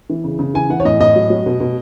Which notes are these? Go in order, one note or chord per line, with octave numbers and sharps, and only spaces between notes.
E3
C#3
C#3
E3 G#5
E3 F#5
C#5
A2 D#5
A2 D#5
F#3
F#3
B2
B2